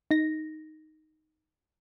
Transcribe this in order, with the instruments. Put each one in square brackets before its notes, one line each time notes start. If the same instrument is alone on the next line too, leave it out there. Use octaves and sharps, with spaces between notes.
[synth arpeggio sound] D#4 A#6